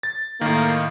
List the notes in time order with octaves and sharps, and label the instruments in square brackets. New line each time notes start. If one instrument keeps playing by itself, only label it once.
[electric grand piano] A6
[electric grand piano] A2 D#3 [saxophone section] A#3